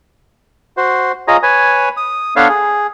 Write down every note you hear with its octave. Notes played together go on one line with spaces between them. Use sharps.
F#4 C5
F4 G#4 C#5 D#5 A#5
B4 C#5 G#5
D#6
B3 D4 A4 B4 C#5 F5
G#4